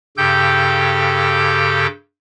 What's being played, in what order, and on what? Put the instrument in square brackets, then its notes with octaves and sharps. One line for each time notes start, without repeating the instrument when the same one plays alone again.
[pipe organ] G2 C#3 G4 A4 G5 G6